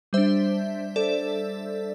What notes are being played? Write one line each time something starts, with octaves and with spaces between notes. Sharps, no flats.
G3 D4 C5 E5
A4 D5